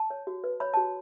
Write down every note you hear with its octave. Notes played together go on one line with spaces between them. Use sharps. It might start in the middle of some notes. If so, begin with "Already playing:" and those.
Already playing: A5
C#5
F#4
B4
C#5 B5
F#4 A5